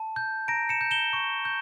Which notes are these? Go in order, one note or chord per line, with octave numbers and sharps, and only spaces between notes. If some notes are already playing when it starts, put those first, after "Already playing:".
Already playing: A5
G6
A#5 A#6 D7
C#7 E7
G6
E7 G7
C#6
G6